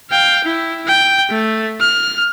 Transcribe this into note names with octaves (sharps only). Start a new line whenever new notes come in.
F5 G5
E4
G5
A3
F6